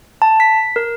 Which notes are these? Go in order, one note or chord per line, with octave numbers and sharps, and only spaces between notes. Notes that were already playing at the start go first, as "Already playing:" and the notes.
A5
B6
A#4